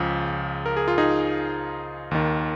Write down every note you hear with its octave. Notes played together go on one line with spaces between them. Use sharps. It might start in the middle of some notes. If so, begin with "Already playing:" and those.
Already playing: C#2 C#3 F3
A#4
G#4
F4
D#4 G#4
D#2 D#3